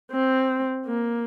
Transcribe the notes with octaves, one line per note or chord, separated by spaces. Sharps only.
C4
A#3